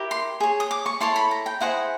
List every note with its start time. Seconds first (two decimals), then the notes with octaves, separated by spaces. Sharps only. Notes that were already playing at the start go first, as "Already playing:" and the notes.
Already playing: E4 G4 A#4
0.11 C6
0.40 G#4 C#5
0.60 D#6
0.71 D6
0.86 C#6
1.00 E4 A4 C#5 C6
1.16 B5
1.31 A#5
1.46 G5
1.61 E4 G#4 C5 D#5 F#5